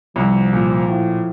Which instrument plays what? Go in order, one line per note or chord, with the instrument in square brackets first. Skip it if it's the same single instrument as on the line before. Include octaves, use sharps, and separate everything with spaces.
[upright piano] C2 [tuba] F3
[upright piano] A#2
A2